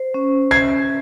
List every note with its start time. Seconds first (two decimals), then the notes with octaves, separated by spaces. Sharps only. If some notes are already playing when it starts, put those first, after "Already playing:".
Already playing: C5
0.14 C#4
0.51 E5 G#6 C7